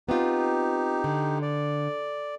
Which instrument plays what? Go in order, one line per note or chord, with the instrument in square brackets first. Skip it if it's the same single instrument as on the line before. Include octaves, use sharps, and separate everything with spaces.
[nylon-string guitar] B3 C4 F4 [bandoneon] D#4 G4
[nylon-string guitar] D3
[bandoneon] D5